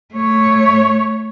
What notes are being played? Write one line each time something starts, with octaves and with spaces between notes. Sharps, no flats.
A3 C#5